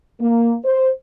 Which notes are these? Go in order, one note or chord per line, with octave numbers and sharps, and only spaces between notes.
A#3
C5